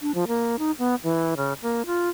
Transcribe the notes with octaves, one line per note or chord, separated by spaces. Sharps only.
D4
F3
A#3
D#4
B3
E3
C#3
A#3
F4